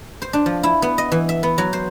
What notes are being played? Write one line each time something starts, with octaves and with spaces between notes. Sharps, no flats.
C5
D4
F3
E4
B3
D#5
E3
E5
B3
F#3
C5